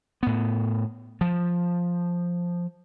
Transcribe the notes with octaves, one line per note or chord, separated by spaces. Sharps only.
A2 B3
F3